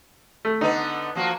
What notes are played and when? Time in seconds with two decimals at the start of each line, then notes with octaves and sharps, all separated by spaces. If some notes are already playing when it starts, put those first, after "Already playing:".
0.45 A3
0.61 D3 B3 D#4
1.15 F3 A#3 F#4